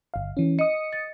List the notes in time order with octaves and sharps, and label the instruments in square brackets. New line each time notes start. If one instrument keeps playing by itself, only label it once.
[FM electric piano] G1 F5
E3 C#4
[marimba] D#5 [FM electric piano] D#6 C#7
[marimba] A6